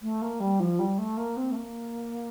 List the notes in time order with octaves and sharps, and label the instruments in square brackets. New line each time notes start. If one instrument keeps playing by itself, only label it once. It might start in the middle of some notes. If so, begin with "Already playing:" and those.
[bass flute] A3
A#3
G3
F3
G3
A3
A#3
C4
A3
A#3